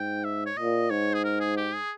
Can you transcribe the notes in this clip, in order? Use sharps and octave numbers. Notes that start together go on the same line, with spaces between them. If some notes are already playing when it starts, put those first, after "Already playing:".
Already playing: G#2 G5
E5
C#5
A#2 D#5
G#2 C#5
G#4
A#4
G#4
G4
G#4